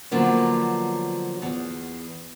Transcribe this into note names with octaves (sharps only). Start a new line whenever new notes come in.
D3 F3 F#3 A#3 B3
E2